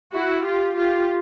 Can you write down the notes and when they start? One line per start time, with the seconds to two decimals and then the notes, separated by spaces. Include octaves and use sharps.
0.14 E4 F#4
0.45 F4 G4
0.76 F4 G4